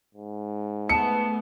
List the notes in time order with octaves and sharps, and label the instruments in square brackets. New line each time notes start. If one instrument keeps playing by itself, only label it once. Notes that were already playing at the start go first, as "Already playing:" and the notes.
[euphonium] G#2
[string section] A3 B3 [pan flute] A5 [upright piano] C#7